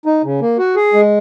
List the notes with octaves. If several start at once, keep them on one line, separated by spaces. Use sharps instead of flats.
D#4
C#3
A#3
F#4
G#4
G#3